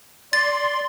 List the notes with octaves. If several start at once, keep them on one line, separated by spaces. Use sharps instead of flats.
D5 C6 A6